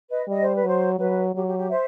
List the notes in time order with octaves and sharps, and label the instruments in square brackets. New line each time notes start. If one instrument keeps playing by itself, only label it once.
[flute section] B4 D#5
[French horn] G3 [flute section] D#5
[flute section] C5
B4
[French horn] F#3 [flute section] C5
[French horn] F#3 [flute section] B4
[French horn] F#3 [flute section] G4
[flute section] G4
G4
C5 E5